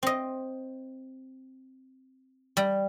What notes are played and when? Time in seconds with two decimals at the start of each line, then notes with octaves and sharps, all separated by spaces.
0.03 C4 D#5
2.57 G3